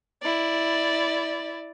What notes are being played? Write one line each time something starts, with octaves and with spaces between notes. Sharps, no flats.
E4 D5